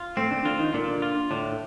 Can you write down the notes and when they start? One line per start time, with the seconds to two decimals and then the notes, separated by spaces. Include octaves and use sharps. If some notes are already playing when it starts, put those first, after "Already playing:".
Already playing: F4
0.17 A2 A3 C4
0.31 D3 D4
0.45 D3 D4 F4
0.59 D#3 D#4
0.74 A#2 D3 D4
1.02 F4
1.31 A2 D3 D4